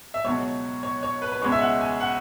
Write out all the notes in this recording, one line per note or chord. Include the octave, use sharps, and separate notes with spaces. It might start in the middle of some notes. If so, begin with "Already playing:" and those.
E5
C#2 B2 F#3 C#5
C#5
C#5
B4
B4
C#2 B2 G#3 C#4 C#5
E5
F#5
G#5
F#5